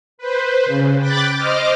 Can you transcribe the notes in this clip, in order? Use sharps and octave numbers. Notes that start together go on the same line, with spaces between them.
B4 C5
C#3
G5 B5 D6 F#6 A6
C5 D#5 D6 F6